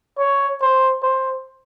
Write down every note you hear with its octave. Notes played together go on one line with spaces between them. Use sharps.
C#5
C5
C5